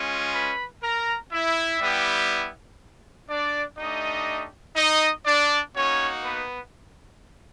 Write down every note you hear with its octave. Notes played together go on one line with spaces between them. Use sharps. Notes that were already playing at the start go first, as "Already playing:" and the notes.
Already playing: G#3 C#4 F4
B4 B5
A#4 A#5
E4 E5
G3 B3 E4 G4
D4 D5
A3 D4 D#4 G4 D#5
D#4 D#5
D4 D5
A#3 C#4 D#4 F#4 C#5
B3 B4